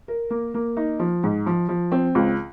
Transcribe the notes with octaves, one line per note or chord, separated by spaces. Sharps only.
A#4
A#3
A#3
D#4
F3
G#2
F3
F3
C4
C#2